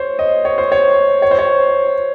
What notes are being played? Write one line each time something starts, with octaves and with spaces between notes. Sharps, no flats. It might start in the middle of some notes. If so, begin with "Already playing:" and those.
Already playing: C5 C#5
D#5
C#5
C5
C#5
C#5
C5
C#5